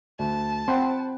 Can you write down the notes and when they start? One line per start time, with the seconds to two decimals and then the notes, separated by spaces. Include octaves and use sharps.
0.19 D2 A5
0.68 C4 F#5 G5 B5 C6